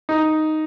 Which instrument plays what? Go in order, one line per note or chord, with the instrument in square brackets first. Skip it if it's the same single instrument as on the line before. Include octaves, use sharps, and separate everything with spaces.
[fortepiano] D#4